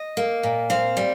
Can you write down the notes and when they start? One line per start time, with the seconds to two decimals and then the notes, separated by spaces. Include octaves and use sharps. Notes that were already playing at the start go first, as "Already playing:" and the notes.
Already playing: D#5
0.17 A#3
0.43 A#2
0.70 C4 F5
0.97 G3